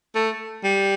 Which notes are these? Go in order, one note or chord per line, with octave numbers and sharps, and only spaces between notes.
A3
G3